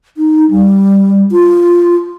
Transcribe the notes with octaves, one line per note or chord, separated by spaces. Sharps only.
D#4
G3
F4